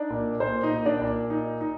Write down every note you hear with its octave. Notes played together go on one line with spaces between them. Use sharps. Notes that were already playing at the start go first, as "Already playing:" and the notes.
Already playing: D4 D#4 D5
A#2
A#2 C5
D#4 D#5
A#2
D4 D5
A#2
D#4
D#4